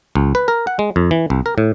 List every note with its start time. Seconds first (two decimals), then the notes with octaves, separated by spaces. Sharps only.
0.15 C#2
0.35 B4
0.48 A#4
0.67 F#5
0.79 G#3
0.96 F2
1.11 E3
1.30 C2
1.46 A#4
1.58 A2